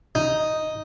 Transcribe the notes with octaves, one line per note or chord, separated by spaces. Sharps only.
D#4